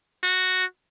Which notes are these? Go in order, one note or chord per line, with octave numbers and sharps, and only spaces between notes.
F#4